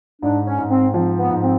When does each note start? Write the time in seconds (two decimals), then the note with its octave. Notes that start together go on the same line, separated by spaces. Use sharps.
0.22 G#2 D4
0.46 C#4
0.59 G#2
0.70 C4
0.94 F3 C4
1.19 B3
1.30 G#2
1.42 C4